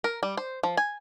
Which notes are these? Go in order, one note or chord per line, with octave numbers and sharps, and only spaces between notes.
A#4
G3
C5
F3
G#5